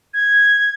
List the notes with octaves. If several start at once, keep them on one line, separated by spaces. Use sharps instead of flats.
G#6